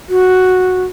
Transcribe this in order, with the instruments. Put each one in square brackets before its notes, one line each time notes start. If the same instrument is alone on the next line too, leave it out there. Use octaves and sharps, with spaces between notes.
[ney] F#4